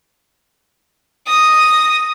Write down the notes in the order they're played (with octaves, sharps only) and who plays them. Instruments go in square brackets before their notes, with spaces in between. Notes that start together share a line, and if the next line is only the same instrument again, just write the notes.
[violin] D#6 A#6